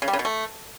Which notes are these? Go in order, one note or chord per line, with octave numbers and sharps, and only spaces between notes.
C#3
G3
C#3
B2
A3